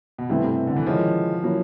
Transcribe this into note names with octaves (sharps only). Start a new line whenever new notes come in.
B2
G2 C3 E3 A3 C4
C3
D3
E3
D#3 F3 G#3 C#4 E4
F#3 A#3 C#4 E4